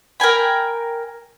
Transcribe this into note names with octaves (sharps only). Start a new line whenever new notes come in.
A#4 G5 G#5 B5